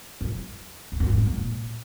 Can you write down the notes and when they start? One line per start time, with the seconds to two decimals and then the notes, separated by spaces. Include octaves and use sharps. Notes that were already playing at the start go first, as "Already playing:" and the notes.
0.21 F#2
0.92 E2
1.00 F#2
1.10 G#2
1.18 F#2
1.27 A#2